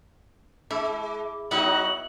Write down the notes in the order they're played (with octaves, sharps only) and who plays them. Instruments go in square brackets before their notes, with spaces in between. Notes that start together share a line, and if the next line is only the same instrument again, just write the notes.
[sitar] G#3 [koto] E4 [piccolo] D6
[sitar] F#3 D#4 F#4 [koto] B3 E4 F#5 [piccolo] F#7